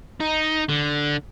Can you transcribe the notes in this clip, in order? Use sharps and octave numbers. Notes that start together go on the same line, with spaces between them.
D#4
D3